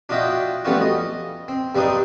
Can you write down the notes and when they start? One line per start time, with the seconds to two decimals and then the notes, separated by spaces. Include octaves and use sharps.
0.09 D4 F4 F#4 D#5 E5 G5
0.65 G3 A3 B3 C#4 F4 F#4
0.81 D#5
1.48 C4
1.75 G2 G3 C4 D4 D#4 D#6